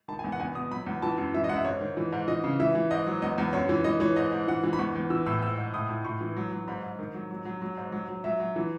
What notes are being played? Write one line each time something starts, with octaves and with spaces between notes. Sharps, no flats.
D#3 A5
G#5
E2
F#5
E2 G#5
B2 D#6
F#3 B5
E2
E3 A5
F#2
E3 E5
D#5
F#2 F#5
E5
G#2 C#5
D#3
E3
G#2
E3 D#5
C#3
E3 E5
E3
G#2 D#5
F#3
E2 D#5
E2
F#2 C#5
E3
E3 D#5
E3 C#5
G#2 D#5
G#2
E3 F#5
E3
B5
E2 C#6
E2
E3 E6
A2 E6
G#2 E6
G#2
A2 D#6
A2
A2 C#6
E3
F#3
F#3
G#2 B5
G#2
D#3
F#3
F#3
F#3
F#3
G#2
F#3
F#3
F#3 E5
F#3
E3